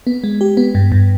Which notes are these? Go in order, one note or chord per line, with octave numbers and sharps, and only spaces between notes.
B3
G#3
G4
B3
G2
G2